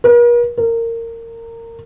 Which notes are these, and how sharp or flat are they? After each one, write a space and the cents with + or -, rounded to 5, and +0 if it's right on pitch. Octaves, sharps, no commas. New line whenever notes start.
A#4 +45
A#4 -20